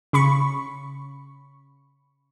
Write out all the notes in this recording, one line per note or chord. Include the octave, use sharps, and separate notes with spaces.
C#3 B5 C#6